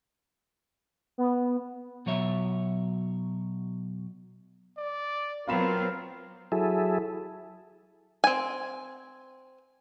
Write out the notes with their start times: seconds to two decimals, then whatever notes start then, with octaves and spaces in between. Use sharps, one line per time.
1.18 B3
2.06 B2 F#3 C#5 E5
4.77 D5
5.48 F#3 B3 C4 F4 A#4 F5 B5 E7
6.52 F#3 E4 G#4 A4
8.24 C4 G#5